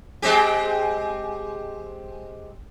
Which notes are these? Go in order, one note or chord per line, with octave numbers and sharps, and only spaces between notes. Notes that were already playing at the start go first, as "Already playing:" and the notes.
G#3 C4 G4